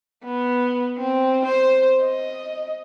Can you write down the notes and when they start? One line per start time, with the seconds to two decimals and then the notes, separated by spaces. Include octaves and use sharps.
0.24 B3
0.98 C4
1.46 C5
2.01 D#5